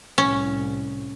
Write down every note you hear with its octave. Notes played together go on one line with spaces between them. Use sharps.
C2 A2 C#4